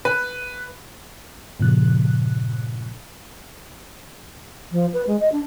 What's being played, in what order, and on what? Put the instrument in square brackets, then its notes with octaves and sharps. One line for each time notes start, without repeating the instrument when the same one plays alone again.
[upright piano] B4
[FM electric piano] G2 A#2 C#3 F3 F#6
[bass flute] F3
B4
G#3
D#5
D4